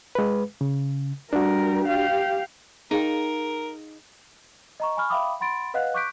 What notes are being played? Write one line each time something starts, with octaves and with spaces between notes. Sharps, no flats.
G#3 B4
C#3
G3 D4 F#4 A#4
G4 F5
D#4 G#4 A#4 F5 G5
D#5 A#5 C#6
G#5 B5 C#6 F6
E5 F5 G5 B5 D6 D#6
F#5 B5 C6 A6 D7
B4 D#5 F5 F#5 F#6
C#6 D6 F#6 G6 B6 D7